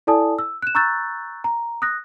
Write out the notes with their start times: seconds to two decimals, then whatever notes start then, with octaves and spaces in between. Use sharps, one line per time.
0.07 E4 A4 D5 G#5 A5 D#6
0.39 E6
0.62 F#6 E7
0.75 A#5 C#6 E6 F#6 G6 A6
1.44 A#5
1.82 D#6 F#6 A#6